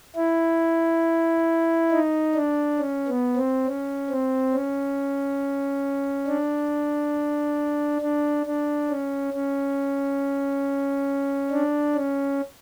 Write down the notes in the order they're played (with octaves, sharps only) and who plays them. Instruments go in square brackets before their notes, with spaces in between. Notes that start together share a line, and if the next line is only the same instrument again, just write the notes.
[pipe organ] E4
D#4
D4
C#4
B3
C4
C#4
C4
C#4
D4
D4
D4
C#4
C#4
D4
C#4